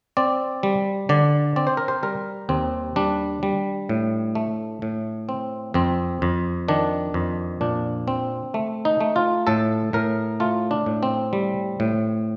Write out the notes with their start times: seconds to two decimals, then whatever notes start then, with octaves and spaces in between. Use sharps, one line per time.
0.17 C4 D5
0.63 G3
1.09 D3 D5
1.56 C4 D5
1.67 C5
1.77 A#4
1.88 C5
2.03 G3 A#4
2.49 D#2 C4
2.96 G3 D4
3.43 G3
3.89 A2
4.35 A3
4.82 A2
5.29 C4
5.74 F2 C4
6.22 F2
6.68 D#3 D4
7.14 F2
7.61 A#2 D4
8.08 C4
8.54 A3
8.85 D#4
9.01 A3
9.16 F4
9.47 A2 A4
9.93 A2 A#4
10.40 A3 F4
10.71 D4
10.86 A2
11.03 C4
11.33 G3
11.80 A2